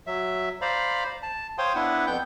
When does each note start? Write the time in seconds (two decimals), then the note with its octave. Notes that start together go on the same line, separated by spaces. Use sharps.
0.07 F#3 E5
0.61 C5 D5 F5 A#5 B5
1.23 A5
1.58 C5 C#5 F5 G5 C6 D#6
1.75 B3 D4 E4 B4 F#5
2.07 F2 B3 G5 G6